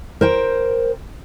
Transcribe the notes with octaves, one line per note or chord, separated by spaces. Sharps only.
A#4 C5 G5